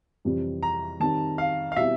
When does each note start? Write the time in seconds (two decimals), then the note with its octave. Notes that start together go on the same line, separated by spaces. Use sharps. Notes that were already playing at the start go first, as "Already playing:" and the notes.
0.25 F2 C3 E3 G3 C4
0.63 A#5
1.00 D#3 G3 C4 D#4 A5
1.38 F5
1.72 F5
1.76 B2 G3 C4 E4 E5